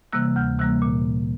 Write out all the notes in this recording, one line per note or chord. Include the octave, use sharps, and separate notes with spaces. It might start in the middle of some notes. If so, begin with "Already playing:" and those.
C3 E3 G3 A#3 E6 F#6
D2 F6 G6
C3 E3 G3 A#3 E6 F#6
A#2